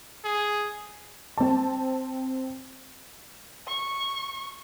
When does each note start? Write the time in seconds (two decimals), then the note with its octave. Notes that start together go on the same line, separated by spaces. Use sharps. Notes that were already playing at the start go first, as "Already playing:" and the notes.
0.24 G#4
1.38 C4 A5
3.68 C#6